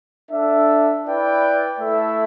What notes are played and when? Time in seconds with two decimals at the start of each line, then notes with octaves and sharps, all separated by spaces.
0.30 D4 A4 E5
1.05 E4 B4 D5 G5
1.79 A3 E4 A4 E5